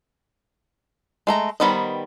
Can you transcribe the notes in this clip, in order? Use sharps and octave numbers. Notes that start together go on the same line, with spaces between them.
G#3 A3 A#5
D#3 G3 B3 C5 D#5